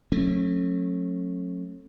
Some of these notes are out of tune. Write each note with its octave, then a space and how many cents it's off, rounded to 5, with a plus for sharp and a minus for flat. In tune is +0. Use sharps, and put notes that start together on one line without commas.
F#3 -30 A3 +0 C#4 -35